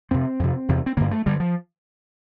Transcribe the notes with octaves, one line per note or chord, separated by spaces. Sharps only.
F2 C3 C4
F2 C3
E2 C3
C4
G2 D3 A#3
A3
G2 D3 G3
F3